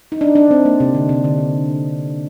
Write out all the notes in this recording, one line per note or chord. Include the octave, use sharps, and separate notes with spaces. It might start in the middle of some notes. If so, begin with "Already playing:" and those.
D#4
D4
D4
C4
A#3
C3
D3
C3
D3
D3